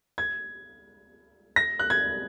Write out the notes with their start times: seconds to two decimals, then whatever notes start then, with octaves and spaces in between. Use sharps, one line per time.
0.18 G#6
1.56 A#6
1.79 F#6
1.90 G#6